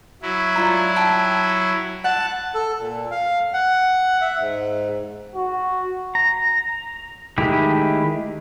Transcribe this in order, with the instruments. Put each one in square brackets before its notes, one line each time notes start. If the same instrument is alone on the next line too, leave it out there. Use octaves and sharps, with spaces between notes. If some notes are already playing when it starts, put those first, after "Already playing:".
[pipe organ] F#3 E4
[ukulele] D4 F4 A#5
G5 A5
[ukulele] F#5 [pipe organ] A5 F#6
[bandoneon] A4
A#2
F5
F#5
E5
G#2
[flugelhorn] F#4
[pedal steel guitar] A#5
D#3 G#3 A3 E4 G4